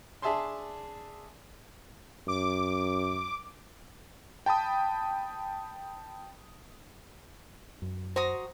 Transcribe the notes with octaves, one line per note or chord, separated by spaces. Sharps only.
D4 G#4 E5 G#5 A5 C6
F#2 D6
G5 A5 B5 D#6
F#2
F#4 C5 A#5 D#6